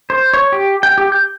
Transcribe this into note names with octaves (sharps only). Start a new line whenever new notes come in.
C5
C#5
G4
G5
G4
G6